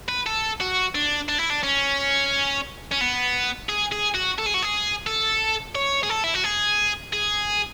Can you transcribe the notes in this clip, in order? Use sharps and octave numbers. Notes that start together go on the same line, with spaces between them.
B4
A4
F#4
D4
D4
E4
D4
C#4
C#4
B3
G#4
G#4
F#4
A4
G#4
F#4
G#4
A4
C#5
G#4
A4
E4
F#4
G#4
G#4